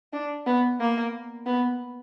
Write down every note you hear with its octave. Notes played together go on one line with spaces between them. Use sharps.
D4
B3
A#3
B3